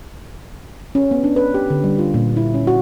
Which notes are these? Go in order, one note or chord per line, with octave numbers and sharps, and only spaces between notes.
C#4
B3
D4
B4
G4
D3
G3
F4
A#2
E4
C#4
F#4